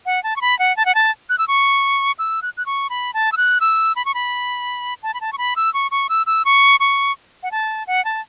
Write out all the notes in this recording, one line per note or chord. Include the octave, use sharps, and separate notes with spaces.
F#5
A5
C#6
B5
F#5
A5
F#5
A5
F#6
E6
C#6
E6
F#6
F#6
C#6
B5
A5
E6
F#6
E6
B5
C#6
B5
A5
B5
A5
C#6
B5
E6
C#6
C#6
E6
E6
C#6
C#6
F#5
A5
F#5
A5